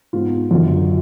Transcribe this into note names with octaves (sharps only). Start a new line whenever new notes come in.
G#2 G#3 B3 F4
F#2 D3 F#3 F4